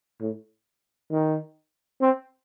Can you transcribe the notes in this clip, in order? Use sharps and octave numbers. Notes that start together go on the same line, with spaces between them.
A2
D#3
C4